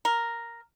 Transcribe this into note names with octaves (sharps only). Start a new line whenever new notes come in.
A#4